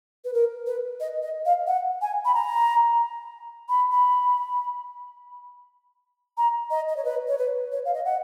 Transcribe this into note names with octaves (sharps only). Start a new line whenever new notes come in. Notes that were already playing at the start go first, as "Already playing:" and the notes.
B4
A#4
B4
D#5
D#5
F5
F#5
G#5
B5
A#5
B5
B5
A#5
D#5
D#5
C#5
B4
C#5
B4
C#5
F5
D#5
F#5